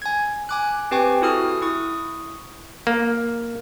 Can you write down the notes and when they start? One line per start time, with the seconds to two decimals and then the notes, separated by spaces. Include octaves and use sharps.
0.02 G#5 G#6
0.49 G#5 D6 F#6
0.91 C4 G4 B4 G5 G#5 C#6
1.22 E4 F#4 A4 D#6 F6
1.62 E4 C#6 D#6
2.87 A#3